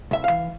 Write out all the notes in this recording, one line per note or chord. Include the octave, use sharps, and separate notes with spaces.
C2 E5
F5
E3